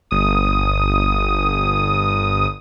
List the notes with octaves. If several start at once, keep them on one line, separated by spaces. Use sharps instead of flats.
G1 D#6